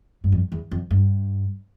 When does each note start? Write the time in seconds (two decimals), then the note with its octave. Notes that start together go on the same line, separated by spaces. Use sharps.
0.24 G2
0.32 F2
0.52 E2
0.71 F2
0.91 G2